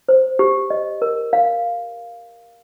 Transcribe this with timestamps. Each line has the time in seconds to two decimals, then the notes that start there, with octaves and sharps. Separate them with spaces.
0.09 C5
0.39 G4
0.70 D#5
1.02 A#4
1.33 F5